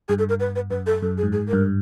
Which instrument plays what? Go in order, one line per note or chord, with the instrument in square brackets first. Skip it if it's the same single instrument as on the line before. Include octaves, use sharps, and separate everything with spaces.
[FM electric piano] G2 [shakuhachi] G#4
[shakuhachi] A4
A#4
B4
B4
[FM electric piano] F#2 [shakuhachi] B4
[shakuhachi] A4
[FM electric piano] F#2 [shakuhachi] A4
[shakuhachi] G#4
[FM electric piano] G#2
[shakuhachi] G#4
[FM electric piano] G2 [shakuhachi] A#4